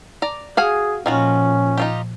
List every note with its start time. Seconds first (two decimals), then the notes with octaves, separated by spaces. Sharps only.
0.22 D5 A#5
0.57 F#4 G#4 F5 G#5
1.06 A#2 D#3 F3 C#4 F4 F#4
1.78 D#4 F4 G4